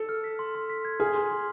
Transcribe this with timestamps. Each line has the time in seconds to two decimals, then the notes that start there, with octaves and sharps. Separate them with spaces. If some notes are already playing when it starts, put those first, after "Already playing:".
Already playing: A4
0.09 F6
0.24 B6
0.39 C6
0.55 C6
0.69 B6
0.85 G#6
1.00 G#4 F6
1.15 C6
1.30 C6